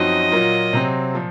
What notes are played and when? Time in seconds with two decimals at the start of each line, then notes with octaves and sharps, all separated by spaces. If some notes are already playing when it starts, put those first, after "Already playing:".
Already playing: F#2 F3 C4 D#4 F#4 D#5
0.32 A#2 F#3 A#3 F4
0.73 C3 F#3 C4
1.15 A#2 F3